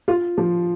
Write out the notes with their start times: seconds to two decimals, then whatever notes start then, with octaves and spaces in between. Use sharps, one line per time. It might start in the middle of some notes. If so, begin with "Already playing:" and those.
0.08 F4
0.38 F3